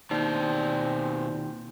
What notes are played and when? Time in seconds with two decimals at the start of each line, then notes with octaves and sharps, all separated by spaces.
0.11 D#2 B2 C4 D#4 D5 A5 G6